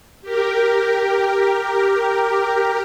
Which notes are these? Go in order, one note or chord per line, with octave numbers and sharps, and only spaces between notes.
G4 A#4